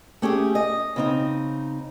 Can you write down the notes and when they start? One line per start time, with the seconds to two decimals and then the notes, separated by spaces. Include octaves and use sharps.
0.22 A3 C#4 G4 G#4
0.55 D#5
0.96 C#3 C4 D#4